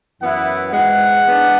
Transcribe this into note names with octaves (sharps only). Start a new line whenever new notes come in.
F#2 E3 B3 E4 F#5
G#2 E3 G#3 F#5
E3 G#3 B3 D4